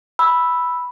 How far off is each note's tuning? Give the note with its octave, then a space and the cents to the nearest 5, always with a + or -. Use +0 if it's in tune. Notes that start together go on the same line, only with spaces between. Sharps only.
B5 +0 E6 +0